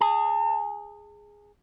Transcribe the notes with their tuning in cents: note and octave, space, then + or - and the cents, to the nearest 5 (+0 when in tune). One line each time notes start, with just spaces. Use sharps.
G#4 -5 A5 +45